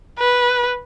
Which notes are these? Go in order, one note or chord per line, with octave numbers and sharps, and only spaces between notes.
B4